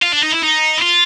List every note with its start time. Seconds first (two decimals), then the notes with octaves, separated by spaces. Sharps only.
0.02 F4
0.12 D4
0.23 D#4
0.32 E4
0.43 D#4
0.78 E4
0.82 F4